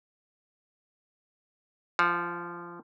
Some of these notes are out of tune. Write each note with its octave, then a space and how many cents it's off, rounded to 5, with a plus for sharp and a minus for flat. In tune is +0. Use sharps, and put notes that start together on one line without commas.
F3 -15 F5 +40